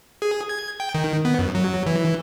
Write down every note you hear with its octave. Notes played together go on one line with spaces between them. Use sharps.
G#4
G#6
G5
D#3
B3
F#2
F#3
E3